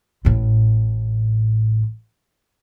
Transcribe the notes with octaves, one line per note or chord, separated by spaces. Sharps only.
A1 A2